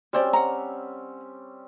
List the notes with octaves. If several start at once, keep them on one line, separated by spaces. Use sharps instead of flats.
G3 C4 C#4 F#4 C5 D5
F#5 A#5